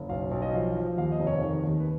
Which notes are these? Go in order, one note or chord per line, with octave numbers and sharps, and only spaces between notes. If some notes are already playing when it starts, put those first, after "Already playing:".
Already playing: F#1
B1 F5
B1
D#5
F3 F5
F3
D#2 F5
D#5
F1
C#5
D#3
D#2
B4